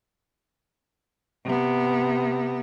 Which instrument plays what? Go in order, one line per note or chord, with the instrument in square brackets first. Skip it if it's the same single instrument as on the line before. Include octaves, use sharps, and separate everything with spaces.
[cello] C3 B3